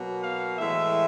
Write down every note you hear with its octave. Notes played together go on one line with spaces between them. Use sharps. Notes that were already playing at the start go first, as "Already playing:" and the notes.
Already playing: B2 F#3 A#3
F5
A2 E3 G#3 E5